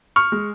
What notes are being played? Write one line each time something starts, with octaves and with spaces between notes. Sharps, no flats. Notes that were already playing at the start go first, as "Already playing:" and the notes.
C#6 F6
G#3